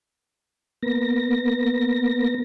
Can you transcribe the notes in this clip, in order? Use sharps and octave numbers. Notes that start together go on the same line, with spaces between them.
A#3 B3 A#6